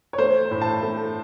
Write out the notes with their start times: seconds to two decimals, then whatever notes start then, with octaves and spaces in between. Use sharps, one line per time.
0.13 C#5
0.18 A3 C5
0.51 A2
0.61 A5
0.83 A3